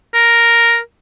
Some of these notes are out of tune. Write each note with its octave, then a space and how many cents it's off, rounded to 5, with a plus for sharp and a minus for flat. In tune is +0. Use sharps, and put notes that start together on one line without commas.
A#4 +0